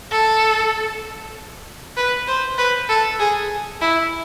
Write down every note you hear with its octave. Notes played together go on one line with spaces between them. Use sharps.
A4
B4
C5
B4
A4
G#4
E4